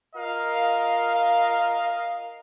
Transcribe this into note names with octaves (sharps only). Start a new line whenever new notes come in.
F4 A#4 D#5 F5